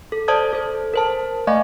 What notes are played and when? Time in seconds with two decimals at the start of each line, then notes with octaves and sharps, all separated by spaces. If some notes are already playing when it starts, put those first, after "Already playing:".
0.12 A4
0.28 C5 D5 A5 D#6 G#6
0.53 A4 C5
0.94 A#4 C5 A5
1.47 A3 D5 D#5 F5 G#5 C#6